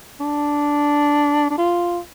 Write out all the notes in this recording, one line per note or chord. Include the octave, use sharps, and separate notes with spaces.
D4
D4
F4